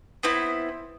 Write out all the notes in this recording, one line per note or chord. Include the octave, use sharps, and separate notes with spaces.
B3 C4 E4